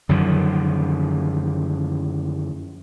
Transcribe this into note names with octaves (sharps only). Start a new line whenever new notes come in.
F#2 D3 D#3 F3